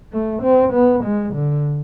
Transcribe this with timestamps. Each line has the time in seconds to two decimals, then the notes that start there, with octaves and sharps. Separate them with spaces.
0.12 A3
0.42 C4
0.73 B3
1.04 G#3
1.35 D3